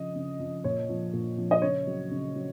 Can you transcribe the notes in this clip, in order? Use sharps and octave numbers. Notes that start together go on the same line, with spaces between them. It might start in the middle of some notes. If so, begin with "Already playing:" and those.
Already playing: C#3 F3 D#5
C#3
F3
A#2 C#5
F3
A#2
F3
D#5
C#3 C#5
F#3
C#3
F#3